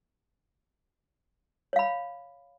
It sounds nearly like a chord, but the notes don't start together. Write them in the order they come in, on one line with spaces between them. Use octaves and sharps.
C#5 F5 B5